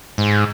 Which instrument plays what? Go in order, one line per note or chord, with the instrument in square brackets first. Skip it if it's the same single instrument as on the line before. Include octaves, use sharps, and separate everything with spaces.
[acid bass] G#2